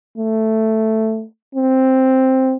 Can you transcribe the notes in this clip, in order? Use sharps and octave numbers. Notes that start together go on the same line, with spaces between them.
A3
C4